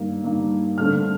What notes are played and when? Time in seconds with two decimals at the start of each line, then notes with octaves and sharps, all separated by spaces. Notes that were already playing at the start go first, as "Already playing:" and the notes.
Already playing: G2 D#3 A#3
0.24 G2 D#3 A#3
0.78 G2 D3 A3 C4 F6